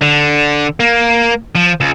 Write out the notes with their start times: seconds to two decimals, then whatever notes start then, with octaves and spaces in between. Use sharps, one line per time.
0.02 D3
0.80 A#3
1.55 F3
1.81 C#2